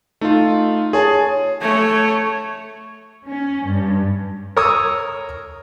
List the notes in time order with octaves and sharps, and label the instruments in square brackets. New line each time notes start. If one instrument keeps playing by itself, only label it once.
[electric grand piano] A3 F4 [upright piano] D#4
[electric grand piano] G#4 G#5 A5 [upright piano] C#5
[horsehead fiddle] A3 C#5
[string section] C#4
G2
[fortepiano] A#4 C#5 A#5 C#6 D#6 E6